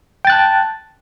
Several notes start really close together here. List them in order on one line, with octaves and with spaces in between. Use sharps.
G5 A6 F#6 A5